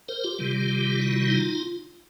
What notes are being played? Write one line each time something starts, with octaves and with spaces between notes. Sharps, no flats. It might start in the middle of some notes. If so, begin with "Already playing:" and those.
A#4 C5
F4 G4
C3 D#3 G3
E4 F#4
D#4 F4